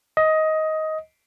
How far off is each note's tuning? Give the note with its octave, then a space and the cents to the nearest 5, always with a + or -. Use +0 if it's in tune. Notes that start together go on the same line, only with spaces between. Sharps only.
D#5 +15